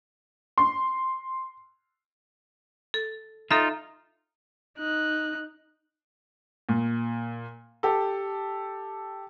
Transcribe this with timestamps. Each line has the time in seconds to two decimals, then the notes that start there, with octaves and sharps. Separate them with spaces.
0.58 C6
2.94 A4
3.51 D#4 F4 A4 E5
4.78 D#4 F#6
6.69 A#2
7.83 G4 A4